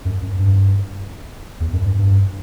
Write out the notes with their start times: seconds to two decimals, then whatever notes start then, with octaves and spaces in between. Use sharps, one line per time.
0.05 F#2
0.22 F#2
0.39 G2
1.60 E2
1.72 F#2
1.86 G2
1.98 G2